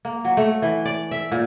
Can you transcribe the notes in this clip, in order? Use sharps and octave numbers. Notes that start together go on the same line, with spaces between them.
A#3
F#3
A3
E3
D5
E5
A#2